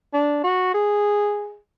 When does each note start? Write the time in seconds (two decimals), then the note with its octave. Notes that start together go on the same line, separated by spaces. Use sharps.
0.13 D4
0.44 F#4
0.74 G#4